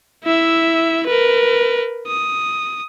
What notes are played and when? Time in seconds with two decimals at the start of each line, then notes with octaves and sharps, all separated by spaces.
0.24 E4 E5
1.07 A#4 B4
2.07 D#6